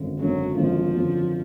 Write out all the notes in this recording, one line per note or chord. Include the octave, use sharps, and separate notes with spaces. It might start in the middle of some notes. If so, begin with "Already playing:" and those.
Already playing: G#1 F#2 D3
G#1 F#2 D3 F#3
G#1 F#2 D3 F3
G#1 F#2 D3